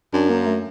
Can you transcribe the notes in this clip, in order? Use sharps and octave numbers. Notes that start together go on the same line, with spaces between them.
F#2 D4
A#3
A3